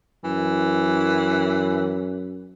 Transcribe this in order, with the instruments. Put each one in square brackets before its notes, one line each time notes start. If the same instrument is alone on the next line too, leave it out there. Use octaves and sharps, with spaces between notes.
[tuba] F#2 [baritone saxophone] E3